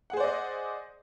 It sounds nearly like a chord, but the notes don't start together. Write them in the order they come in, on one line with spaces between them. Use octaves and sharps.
F#5 G#4 C5 D5 D#5